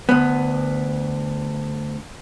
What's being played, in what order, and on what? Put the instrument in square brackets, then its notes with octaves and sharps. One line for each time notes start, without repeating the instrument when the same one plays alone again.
[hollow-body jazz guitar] D2 B3